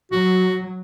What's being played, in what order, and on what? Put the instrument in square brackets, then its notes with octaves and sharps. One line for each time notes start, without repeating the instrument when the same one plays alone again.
[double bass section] F#3 [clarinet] F#4